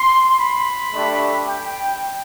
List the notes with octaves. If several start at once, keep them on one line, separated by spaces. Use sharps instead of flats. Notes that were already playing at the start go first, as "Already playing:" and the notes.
Already playing: C6
B5
A3 D4 G4
G5